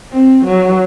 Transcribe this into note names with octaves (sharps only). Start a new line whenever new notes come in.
C4
F#3